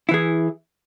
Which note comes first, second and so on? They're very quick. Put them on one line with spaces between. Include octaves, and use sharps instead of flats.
E4 E3 G#4